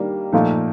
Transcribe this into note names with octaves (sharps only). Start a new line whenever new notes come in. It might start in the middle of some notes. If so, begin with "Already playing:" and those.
Already playing: D#3 G3 A#3 D4
A#2 F3 A3 D#4